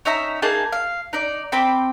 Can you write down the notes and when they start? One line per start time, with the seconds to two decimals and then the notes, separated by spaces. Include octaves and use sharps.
0.05 C#4 D#4 E5 A#5
0.42 A#3 D#4 G#4 A5
0.72 F5
1.13 D#4 D5
1.52 C4 G5 B5 D6